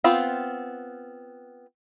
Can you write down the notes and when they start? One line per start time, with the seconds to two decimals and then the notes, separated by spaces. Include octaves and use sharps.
0.04 B3 C4 F4